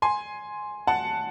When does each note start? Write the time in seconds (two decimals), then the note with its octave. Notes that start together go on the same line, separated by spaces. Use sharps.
0.02 G#5 C6
0.87 F#5 A5